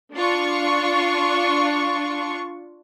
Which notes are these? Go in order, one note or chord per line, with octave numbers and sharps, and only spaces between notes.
D4 F4 C#6